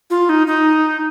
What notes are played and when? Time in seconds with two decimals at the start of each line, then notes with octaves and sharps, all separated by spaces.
0.10 F4
0.29 D#4
0.47 D#4